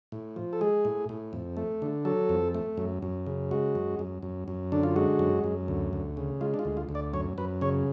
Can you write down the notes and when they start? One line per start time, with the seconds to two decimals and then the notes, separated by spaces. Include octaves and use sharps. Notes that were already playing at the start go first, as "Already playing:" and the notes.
0.12 A2
0.36 F3
0.53 A4
0.61 G#3 G#4
0.85 A2
1.09 A2
1.33 F2
1.57 A3
1.82 D3
2.05 F#3 A4
2.29 F2
2.55 A3
2.77 F#2
3.02 F#2
3.26 C#3
3.51 G#3 F#4
3.75 F#2
3.99 F#2
4.23 F#2
4.48 F#2
4.72 D3 D4
4.83 F4
4.96 G#3 F#4
5.19 F#2
5.44 F#2
5.68 D2
5.93 D2
6.17 C#3
6.41 G#3 F4
6.54 D4
6.59 F4
6.65 D2
6.77 F4
6.89 D2
6.95 D5
7.13 F#2 C#5
7.38 F#2 B4
7.61 C#3 C#5